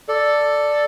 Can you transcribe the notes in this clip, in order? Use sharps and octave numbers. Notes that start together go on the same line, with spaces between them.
A4 D5